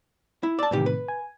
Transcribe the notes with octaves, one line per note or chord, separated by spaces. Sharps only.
E4
D5 A5 E6
D#2 A2 C3 D#3 E3 G4
B4
G#5